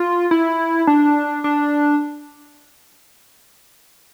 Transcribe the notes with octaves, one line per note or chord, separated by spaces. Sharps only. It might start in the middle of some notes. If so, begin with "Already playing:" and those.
Already playing: F4
E4
D4
D4